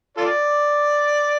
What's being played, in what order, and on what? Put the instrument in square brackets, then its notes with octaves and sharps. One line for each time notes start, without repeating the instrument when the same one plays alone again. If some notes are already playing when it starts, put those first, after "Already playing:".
[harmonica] F4 A4 D5